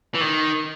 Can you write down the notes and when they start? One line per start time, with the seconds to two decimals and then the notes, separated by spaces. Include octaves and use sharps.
0.15 E3
0.21 D#3